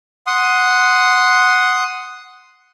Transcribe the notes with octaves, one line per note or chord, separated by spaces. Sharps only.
F#5 C6 D#6